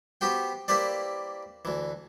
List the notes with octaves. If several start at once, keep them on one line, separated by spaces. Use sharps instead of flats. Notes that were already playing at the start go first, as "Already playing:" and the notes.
B3 F#4 G4 C5 G5
A#3 E4 G4 B4 C5 D5
D2 E3